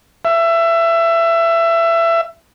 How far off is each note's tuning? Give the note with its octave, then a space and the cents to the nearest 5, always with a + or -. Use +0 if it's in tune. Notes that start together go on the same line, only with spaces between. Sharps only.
E5 +20